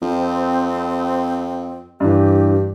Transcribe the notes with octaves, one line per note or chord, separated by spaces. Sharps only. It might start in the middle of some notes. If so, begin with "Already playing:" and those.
F2 C4
G2 E3 G4